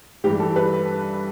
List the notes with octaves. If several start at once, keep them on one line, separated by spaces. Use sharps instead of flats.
G2 E3 G3 G4
A4
B4